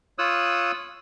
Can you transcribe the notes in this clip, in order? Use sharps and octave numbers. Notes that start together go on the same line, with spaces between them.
F4 C#5 D#6 E6 F#6